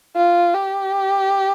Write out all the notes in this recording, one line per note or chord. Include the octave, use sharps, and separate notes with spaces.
F4
G4